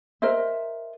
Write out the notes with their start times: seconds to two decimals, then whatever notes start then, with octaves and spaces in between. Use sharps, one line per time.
0.22 A#4 C5 D#5 E5